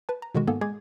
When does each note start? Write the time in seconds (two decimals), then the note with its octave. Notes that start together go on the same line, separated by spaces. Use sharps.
0.09 B4 A5
0.22 A#5
0.35 B2 D3 D#3 G#3 F#4
0.47 G#2 A#3 B3 A4 G#5
0.61 G#3 G#4 G#5 D6 G#6